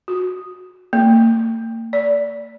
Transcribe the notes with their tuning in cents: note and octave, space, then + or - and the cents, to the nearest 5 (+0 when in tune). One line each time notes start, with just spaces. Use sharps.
F#4 -20
A#3 -45
D5 -20